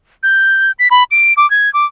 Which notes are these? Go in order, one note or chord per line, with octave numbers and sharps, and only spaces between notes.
G6
B6
B5
D7
D6
G#6
D6